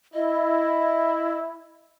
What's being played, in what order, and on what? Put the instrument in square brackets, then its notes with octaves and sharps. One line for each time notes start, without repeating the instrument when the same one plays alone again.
[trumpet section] E4 [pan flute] D#5